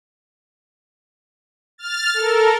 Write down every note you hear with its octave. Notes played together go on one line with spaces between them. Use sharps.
F6 A6
A4 A#4